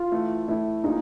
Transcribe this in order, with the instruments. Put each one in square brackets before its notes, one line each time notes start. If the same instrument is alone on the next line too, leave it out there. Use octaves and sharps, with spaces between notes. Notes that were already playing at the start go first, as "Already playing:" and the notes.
Already playing: [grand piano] F4
[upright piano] A2 E3 A3
[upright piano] A2 E3 A3 [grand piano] E4
[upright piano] F3 A#3 D4 F4 G#4 [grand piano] D#4